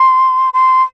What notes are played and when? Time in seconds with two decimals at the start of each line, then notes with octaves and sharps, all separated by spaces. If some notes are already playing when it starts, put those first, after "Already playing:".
Already playing: C6
0.54 C6